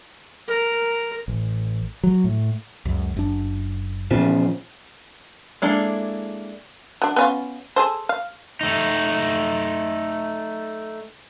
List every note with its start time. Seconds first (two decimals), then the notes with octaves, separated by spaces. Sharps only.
0.48 A#4
1.28 A1
2.03 F#3
2.24 A2
2.85 C#2 F#2
3.14 F#1 F#2 D4
4.11 E2 A#2 C#3 F3
5.62 G#3 A#3 D4 E4 A4
7.02 F#3 D4
7.16 B3 C#4 F4
7.76 G#4 A4 C5
8.09 F5
8.61 A3 D#4